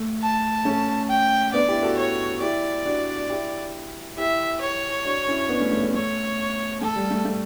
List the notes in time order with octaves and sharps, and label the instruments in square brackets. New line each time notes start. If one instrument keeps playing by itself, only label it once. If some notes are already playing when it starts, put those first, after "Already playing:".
Already playing: [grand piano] A3
[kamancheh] A5
[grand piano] A3 C#4
[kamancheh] G5
[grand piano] B3 D4 [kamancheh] D5
[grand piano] E4 G4
F#4 A4
[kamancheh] C#5
[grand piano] E4 G4 [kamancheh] D5
[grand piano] D4 F#4
E4 G4
[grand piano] E4 G4 [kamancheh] E5
[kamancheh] C#5
[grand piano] D4 F#4
C#4 E4
B3 D4
A3 C#4
A3
A3
[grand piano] A3 [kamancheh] C#5
[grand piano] A3 [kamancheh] A4
[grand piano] G3
A3
A3